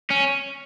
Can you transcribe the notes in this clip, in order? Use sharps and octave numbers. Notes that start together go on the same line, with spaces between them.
C#4